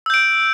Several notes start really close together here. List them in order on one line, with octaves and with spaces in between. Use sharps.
E6 G6 D7